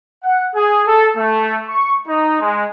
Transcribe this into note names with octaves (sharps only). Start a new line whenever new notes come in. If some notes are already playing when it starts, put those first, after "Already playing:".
F#5
G#4
A4
A3
C#6
D#4
G#3